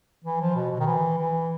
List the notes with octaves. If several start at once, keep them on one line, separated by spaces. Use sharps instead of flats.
E3
F3
B2
B2
D#3
E3
E3